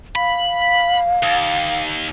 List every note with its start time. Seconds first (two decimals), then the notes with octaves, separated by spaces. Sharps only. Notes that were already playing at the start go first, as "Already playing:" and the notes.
0.16 F5 B5
1.23 D#2